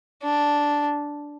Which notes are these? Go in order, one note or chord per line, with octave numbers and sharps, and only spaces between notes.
D4